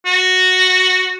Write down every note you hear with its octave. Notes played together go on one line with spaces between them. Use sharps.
F#4